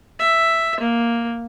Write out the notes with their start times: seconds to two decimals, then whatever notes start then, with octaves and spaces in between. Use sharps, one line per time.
0.20 E5
0.80 A#3